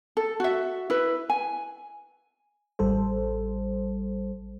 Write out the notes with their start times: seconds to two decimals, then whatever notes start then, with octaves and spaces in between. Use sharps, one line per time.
0.17 A4
0.40 F#4 E5
0.90 E4 B4
1.30 G#5
2.79 A1 G3 A4 C5